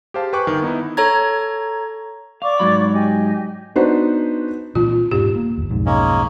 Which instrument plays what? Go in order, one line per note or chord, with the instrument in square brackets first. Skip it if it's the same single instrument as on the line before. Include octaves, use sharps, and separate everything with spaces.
[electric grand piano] G4 G#4 C5 F5 A5
B4 G5 G#5 C#6 D6 F#6
G1 D#3
B3 D#4 E4
[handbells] A4 C#5 A#5 G#6
[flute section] D5 C#6 D6 [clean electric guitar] F5
[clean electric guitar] G#2 F#3 B5
[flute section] G4 D#5 G#5
[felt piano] B3 D4 D#4 F#4 B4 C5
[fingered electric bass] A#2 E3 C4 [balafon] F4
[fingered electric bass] E1 G#2 D4 [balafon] G4
[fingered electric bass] A#3
G1 D#2
B1 F2 G#2
[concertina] G#3 A#3 C#4